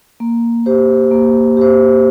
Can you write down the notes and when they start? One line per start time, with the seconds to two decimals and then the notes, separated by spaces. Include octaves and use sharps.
0.20 A#3
0.66 G4 C5
1.11 A#3
1.57 G4 C5